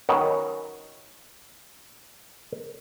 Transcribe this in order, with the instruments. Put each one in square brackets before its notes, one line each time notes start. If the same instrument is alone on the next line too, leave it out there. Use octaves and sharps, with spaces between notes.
[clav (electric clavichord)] D#3 F#3 B3 C#4